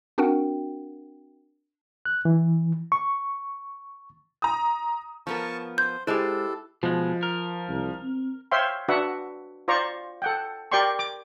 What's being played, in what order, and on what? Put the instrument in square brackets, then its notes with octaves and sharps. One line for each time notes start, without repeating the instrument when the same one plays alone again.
[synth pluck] C4 D4 F#4 A#4 F#5 G5
[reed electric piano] F#6
E3
C#6
[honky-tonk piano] A#5 D#6
[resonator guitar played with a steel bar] F3 B3 A#4 [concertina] A5 C#6
[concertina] C5 [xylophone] G6
[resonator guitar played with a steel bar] G#3 C5 [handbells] E4 G4 [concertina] A4
[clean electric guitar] B2 G#3 [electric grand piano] F3
[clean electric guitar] A#4
[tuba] C2
C4
[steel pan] C5 C#5 E5 F5 G5 C6
D4 F#4 B4 E5 F#5
F4 C5 D5 A#5 C#6
A4 F#5 G5
G4 A#4 D5 G5 C6 C#6
D6